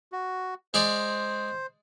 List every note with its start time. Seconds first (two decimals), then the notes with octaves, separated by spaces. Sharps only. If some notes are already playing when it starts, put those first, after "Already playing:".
0.12 F#4
0.74 G#3 G#4 C5 D5